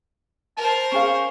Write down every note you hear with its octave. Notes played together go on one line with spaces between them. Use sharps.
A#4 C5 A5
C#4 G#4 F5 C#6